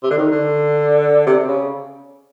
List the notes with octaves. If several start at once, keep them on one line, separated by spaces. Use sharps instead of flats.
C3
D3
D#3
D3
C3
C3
C#3